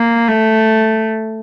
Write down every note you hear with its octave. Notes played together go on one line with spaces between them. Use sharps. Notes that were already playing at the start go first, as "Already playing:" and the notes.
Already playing: A#3
A3